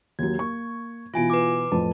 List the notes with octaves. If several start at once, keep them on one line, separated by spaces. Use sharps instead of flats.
D#2 F#3 G#6
A#3 C#6
B2 E3 F4 G#5 D7
B4 D6
F2 A2 B4 A5